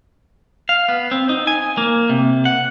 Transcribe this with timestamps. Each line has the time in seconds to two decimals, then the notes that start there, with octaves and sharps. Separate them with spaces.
0.69 F5
0.88 B3
1.11 C4
1.29 D#4
1.47 G#5
1.77 A#3
2.09 C3
2.45 F#5